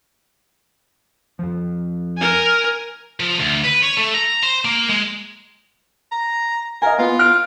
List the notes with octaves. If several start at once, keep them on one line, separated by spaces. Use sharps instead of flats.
F2 F3
A#4 G#5
F3
D2
B4
C#5
A3
A#5
C5
A#3
G#3
A#5
A#4 D#5 F5 G#5
B3 F4
F6 D7